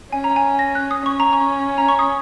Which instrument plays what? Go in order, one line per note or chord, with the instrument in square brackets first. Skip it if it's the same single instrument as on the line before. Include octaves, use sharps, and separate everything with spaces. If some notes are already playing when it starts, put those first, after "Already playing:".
[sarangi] C#4 [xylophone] G#5
[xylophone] A#5
G#5
A#6
F#6
D#6
[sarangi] C#4 [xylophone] C#6
[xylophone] A#5
C#6
A#5
C#6
D#6